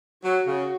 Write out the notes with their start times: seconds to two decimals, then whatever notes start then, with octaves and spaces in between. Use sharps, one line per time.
0.24 F#3 F#4
0.47 C#3